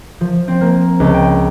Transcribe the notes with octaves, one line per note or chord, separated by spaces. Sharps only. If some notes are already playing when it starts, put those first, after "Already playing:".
F3
C4
A#3
C#2
G5